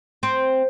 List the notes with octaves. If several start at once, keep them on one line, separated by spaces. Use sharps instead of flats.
C4